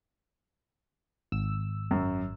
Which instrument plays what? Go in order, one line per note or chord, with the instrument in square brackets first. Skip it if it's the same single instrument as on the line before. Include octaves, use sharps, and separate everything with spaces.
[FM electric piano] G#1 E6
[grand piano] F#2